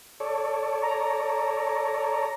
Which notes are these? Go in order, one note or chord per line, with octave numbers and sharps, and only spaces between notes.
A4 C#5 D5
A#5